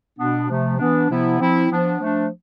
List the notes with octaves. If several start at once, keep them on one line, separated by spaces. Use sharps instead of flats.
B2 B3 D4
C3 F3 A3
E3 B3 D4
C3 F3 B3 E4
F3 C4 E4
F3 B3 D4
F3 A3 D4